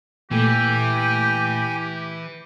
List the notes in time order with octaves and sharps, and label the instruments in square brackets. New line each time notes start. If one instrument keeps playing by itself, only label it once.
[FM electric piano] A#2 A3 [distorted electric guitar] E3 [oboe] G4 [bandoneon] G5 G#5